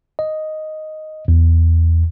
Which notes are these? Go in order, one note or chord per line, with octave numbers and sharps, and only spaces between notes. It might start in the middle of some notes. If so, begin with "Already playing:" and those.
D#5
E2